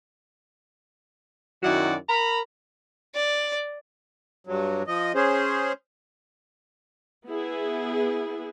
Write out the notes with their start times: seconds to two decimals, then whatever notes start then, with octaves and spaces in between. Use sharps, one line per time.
1.63 F#2 D#3 E4 F#4 D5 F#5
2.09 A#4 A#5 B5
3.15 D5
4.47 G2 F#3
4.87 F3 D#5
5.15 C#4 G#4 C5
7.27 B3 E4 G#4